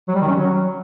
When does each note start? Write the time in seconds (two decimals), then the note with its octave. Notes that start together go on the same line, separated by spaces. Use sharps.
0.08 F#3
0.15 G3
0.21 D#3
0.28 C#4
0.35 F#3